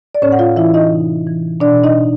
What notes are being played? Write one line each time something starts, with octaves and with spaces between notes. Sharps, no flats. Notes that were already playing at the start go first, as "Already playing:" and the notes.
D5
A2 C#4 C#5
F#5
F4 F5
E3 E4 E5
D#4 D#5
C3
E3
B2 D4 D5
D#4 D#5